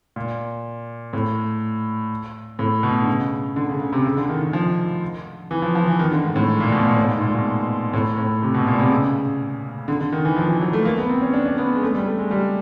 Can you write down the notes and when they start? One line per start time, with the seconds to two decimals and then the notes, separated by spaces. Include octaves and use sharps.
0.16 A#2
1.13 A2
2.59 A2
2.83 B2
3.02 D3
3.08 C#3
3.56 D3
3.69 C#3
3.81 C#3
3.93 C3
4.05 C#3
4.17 D3
4.29 D#3
4.41 D#3
4.53 F3
5.51 E3
5.62 F3
5.75 F3
5.87 E3
5.99 D#3
6.12 D3
6.23 G#2
6.36 A2
6.60 A#2
6.72 B2
6.84 A#2
6.97 A2
7.09 G#2
7.21 A#2
7.33 B2
7.93 A2
8.18 A2
8.42 C3
8.54 B2
8.67 A#2
8.79 C3
8.91 C#3
9.88 D3
10.00 D3
10.12 D#3
10.25 E3
10.37 F3
10.49 E3
10.61 F#3
10.73 A3
10.85 A#3
10.97 B3
11.09 C4
11.22 C#4
11.34 D4
11.46 C#4
11.58 B3
11.75 G#3
11.83 A3
11.95 G3
12.06 A3
12.19 G#3
12.31 G3